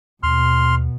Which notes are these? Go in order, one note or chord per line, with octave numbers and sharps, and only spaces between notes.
D#2 B2 C6 F6